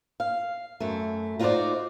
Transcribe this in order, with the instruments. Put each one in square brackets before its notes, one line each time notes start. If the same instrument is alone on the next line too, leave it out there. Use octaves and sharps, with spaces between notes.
[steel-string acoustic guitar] F5
F#2 A3
D#4 F4 F#4 A#4 C5 D5